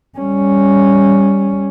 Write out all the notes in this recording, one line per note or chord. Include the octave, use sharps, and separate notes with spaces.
G3 C#4